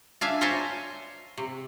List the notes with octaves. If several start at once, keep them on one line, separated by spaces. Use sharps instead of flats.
D4 E5 F5 G#5
A#4 C5 C#5 E5 G#5 A5
C3